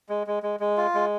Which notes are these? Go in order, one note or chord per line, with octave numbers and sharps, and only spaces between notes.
G#3
G#3
G#3
G#3
F4
G#3